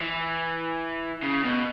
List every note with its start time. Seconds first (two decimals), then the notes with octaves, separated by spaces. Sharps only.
0.01 E3
1.23 C#3
1.44 B2